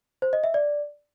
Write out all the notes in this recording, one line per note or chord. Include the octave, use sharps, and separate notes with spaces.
C5
D#5
E5
D5